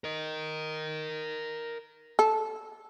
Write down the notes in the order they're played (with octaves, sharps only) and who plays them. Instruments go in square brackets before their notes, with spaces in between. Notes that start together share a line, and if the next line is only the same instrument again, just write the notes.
[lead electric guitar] A#4 D#5
[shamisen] A4